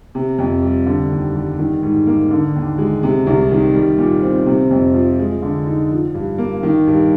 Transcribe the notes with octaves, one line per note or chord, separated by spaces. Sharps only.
C3
F2
G3
D3
D#2
G3
D#3
G#2
A#3
D3
D#2
G#3
C3
C2
D#3
G3
A#2
C4
C3
F2
F3
G#3
D3
D#4
F3
G2
A#3
D#3
G2